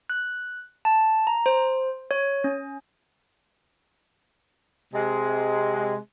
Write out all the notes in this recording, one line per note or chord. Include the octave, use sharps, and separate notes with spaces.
F#6
A5
A#5
C5
C#5
C#4
C3 G#3